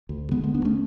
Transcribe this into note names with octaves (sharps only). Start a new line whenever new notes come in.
D2
D3 G#3 B3
G#3 B3
D2 B3 D4
A3 C#4